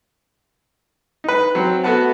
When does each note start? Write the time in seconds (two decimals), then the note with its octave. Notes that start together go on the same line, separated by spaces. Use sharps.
1.24 D#4 B4
1.55 F#3 C4
1.83 A3 B3 F#4 B4 F#5 A5